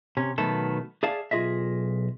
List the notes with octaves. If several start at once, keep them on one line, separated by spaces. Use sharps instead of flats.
C3 C#4
B2 D#3 F#3 A3 B3 A4
G#4 D5 E5 F5 A5
B1 F4 G#4 D#5 E5